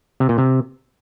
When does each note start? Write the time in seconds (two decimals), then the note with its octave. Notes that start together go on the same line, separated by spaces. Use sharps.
0.20 C3
0.29 A#2
0.38 C3